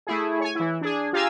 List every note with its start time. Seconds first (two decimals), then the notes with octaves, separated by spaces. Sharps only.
0.07 A3 E4 G#4
0.40 C#5 G#5
0.55 E3 E4
0.81 D4 G#4
1.13 F4 G4 F5 G#5 A#5 E6